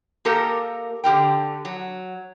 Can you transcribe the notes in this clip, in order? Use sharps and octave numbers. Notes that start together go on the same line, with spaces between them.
A#3 G4 A4 A#4 D#5 E5
D3 G4 A#4 G5
F#3